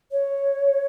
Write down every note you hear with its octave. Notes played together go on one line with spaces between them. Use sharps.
C#5